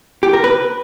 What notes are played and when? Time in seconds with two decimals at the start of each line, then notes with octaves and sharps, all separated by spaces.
0.23 G4
0.33 A#4
0.44 B4